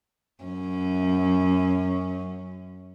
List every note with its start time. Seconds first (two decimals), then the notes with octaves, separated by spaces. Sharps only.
0.44 F#2 C#4